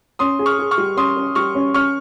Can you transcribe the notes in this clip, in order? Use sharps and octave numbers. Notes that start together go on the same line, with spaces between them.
C#4 C6 D#6
G#4
C#6 F6
G#4
C#6 F6
G3
C#4 C6 D#6
C#4
G3 C#6 F6
C#4
C#4 C#6 F6